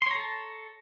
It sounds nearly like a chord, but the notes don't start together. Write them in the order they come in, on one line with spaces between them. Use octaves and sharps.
C6 C#5 A#5 A4 A5